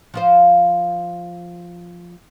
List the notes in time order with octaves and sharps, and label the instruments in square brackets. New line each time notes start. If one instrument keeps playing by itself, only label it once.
[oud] F3 F4 C5